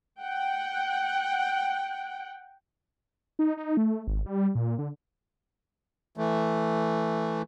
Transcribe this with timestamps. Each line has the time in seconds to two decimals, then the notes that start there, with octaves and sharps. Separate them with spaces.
0.21 F#5 G5
3.39 D#4
3.57 D#4
3.77 A3
4.07 G#1
4.26 G3
4.55 A#2
4.79 D3
6.17 E3 A3